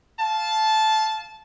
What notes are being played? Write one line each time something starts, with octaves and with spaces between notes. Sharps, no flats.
F5 A5